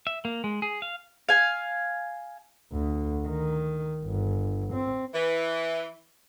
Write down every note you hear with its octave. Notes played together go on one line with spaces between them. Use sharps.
E5
A#3
G#3
G#4
F5
F5 G#5
D2
D#3
G1
C4
E3